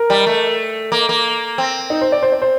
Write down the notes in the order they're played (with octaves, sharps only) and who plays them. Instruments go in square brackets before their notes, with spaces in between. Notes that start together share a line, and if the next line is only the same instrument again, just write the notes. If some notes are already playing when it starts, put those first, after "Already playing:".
Already playing: [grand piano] A#4
[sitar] G3
A3
A#3
A#3
C4
[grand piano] D#4
C5
D5
C5
D5
C5